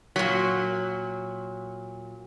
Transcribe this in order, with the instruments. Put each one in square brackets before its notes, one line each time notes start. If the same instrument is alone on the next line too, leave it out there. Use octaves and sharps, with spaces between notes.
[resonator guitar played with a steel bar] A#2 F#3